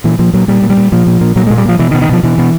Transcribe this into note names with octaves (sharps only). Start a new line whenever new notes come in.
A#2 E3
A#2 F3
A#2 F#3
A#2 G3
A#2
G3
A#2
A#2 F3
A#2
A#2
A#2 F#3
A#2 G#3
G3
A#2 F3
B2 E3
D#3
B2
D#3
B2 F3
B2 E3
B2